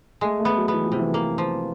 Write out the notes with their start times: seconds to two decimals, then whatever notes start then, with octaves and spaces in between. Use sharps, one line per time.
0.21 G#3 A3
0.40 A3
0.45 B3
0.57 F#3
0.68 B3
0.73 E3
0.86 F3
0.92 C3
0.99 E3
1.14 A#3
1.38 F3